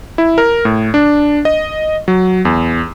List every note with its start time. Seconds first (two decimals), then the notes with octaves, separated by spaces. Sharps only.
0.18 E4
0.38 A#4
0.65 A2
0.94 D4
1.45 D#5
2.08 F#3
2.45 E2